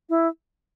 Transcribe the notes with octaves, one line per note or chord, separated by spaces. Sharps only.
E4